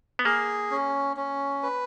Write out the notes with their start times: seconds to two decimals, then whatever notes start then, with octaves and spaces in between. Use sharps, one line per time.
0.19 B3
0.25 A#3 G#4
0.71 C#4
1.17 C#4
1.63 B4